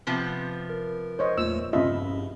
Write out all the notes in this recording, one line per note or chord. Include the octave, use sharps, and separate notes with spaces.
C3 F3 B3
A#4
C5 C#5 D#5
E2 A#2 A3 E6
C2 G2 C#3 F4 D#5 E5 B5